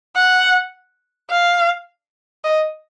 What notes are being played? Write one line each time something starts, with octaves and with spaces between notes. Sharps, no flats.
F#5
F5
D#5